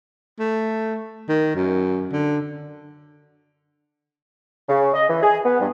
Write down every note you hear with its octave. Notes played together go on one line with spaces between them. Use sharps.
A3
D#3
F#2
D3
C#3
D#5
E3
G#4
B3
G2